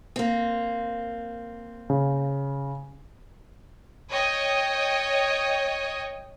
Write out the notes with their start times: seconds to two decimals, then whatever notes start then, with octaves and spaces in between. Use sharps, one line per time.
0.16 A#3 C4
1.90 C#3
4.12 C#5 D#5 G5